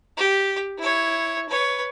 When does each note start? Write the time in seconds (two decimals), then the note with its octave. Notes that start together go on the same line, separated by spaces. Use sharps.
0.17 G4
0.78 E4 C#5
1.49 B4 C#5